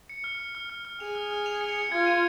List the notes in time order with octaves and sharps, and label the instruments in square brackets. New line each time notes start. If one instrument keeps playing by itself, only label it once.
[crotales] C#7
F6
F6
F6
F6
F6
[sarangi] G#4 [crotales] F7
[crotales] F6
F6
F7
C#7
C#7
[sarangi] F4 [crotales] G#6
[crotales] D#7